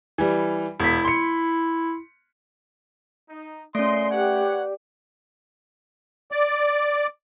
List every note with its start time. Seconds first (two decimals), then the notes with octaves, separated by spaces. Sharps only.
0.18 E3 G3
0.80 E1 E4 B6
1.05 C6 C#7
3.30 D#4
3.75 A#2 A3 C#4 D5 D#5 C6
4.11 G4 B4 C#5 F#5
6.32 D5